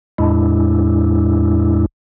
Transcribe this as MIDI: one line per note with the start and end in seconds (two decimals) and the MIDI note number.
0.18 1.86 40
0.18 1.86 45
0.18 1.86 56
0.18 1.86 62
0.18 1.86 64